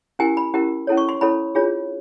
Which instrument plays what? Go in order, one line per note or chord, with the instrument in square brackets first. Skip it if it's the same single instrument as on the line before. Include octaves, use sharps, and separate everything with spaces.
[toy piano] C#4 E4 G4 A#4 G#5
B5
C#4 E4 G4 A#4
C#4 E4 A4 C#5
C#6
C6
C#4 E4 A4 C#5 B5
D4 F4 G#4 C#5